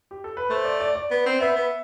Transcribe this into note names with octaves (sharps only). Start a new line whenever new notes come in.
G4
A4
B4
A3 C5
D5
D5
D5
B3
C4
B3 E5
B3